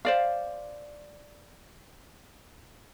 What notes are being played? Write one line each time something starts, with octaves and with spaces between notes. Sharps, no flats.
C5 D5 F5